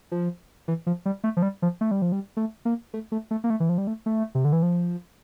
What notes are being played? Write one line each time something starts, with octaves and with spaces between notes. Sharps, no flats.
F3
E3
F3
G3
A3
F3
G3
F3
A3
G3
F3
G3
A3
A#3
A3
A3
A3
A#3
A3
E3
F3
G3
A3
A3
C3
D3
E3
F3